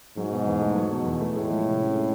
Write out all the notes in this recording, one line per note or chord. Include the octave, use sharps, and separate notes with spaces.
G#2 F#3
B2
E2
A3
F#3
B2
E2
A3
A2 G#3
F3
C3
C#4
G#3